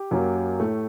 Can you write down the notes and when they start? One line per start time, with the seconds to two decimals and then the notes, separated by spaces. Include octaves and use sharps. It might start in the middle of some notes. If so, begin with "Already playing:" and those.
Already playing: G4
0.11 F#2 F#3 A#3
0.60 A2 A3